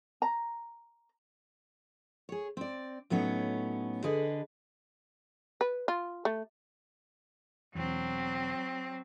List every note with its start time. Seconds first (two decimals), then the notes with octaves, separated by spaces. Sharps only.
0.22 A#5
2.29 G#4 C#5
2.57 C4 D5
3.10 A2 F#3 B3 C#4 D#4 C#5
4.04 D3 G#4 B4 D#5
5.61 B4
5.88 F4
6.25 A3
7.75 E1 E2 F#3 C4